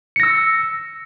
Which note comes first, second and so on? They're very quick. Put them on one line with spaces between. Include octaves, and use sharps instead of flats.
C#7 A#6 E6